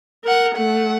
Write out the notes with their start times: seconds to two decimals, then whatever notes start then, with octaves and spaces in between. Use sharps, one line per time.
0.24 A#4 F#5
0.55 A3 F#5